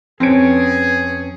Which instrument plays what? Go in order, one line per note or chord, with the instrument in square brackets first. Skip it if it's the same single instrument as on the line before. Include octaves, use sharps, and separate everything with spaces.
[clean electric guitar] F2 C#4 [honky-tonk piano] C4 D7 [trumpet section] G#4 [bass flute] B4